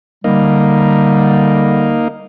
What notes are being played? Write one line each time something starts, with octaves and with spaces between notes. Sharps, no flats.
D3 G3 A#3 D#4